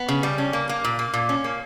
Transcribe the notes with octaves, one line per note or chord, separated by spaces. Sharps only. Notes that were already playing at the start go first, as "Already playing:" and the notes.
Already playing: B3
C#3
G3
C#4
A#3
A#3
A#2
A#3
A#2
C#4
A#3